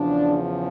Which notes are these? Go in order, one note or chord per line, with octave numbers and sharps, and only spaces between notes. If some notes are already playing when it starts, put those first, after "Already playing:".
Already playing: E2 C#3 F3 D4